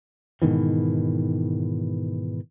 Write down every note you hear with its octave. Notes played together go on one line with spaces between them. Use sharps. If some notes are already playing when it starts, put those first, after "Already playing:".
G#2 B2 D#3 E3